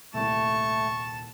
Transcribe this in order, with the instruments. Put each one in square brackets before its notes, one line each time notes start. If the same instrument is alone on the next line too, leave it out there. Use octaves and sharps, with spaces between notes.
[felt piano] D#1 C2 [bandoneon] A3 [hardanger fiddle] A5 [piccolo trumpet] C#6